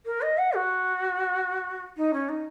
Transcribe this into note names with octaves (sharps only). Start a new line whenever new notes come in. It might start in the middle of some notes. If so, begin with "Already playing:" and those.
A#4
D#5
F#5
F#4
D#4
C#4
D#4